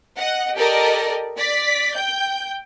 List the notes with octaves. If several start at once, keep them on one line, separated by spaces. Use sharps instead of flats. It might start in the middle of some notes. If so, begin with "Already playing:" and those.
D#5 F#5
G4 A4 A#4 D5 D#5
D5 B6
G5 G6